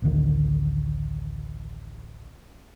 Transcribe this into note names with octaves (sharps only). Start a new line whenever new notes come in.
A1 D2 D3 D#3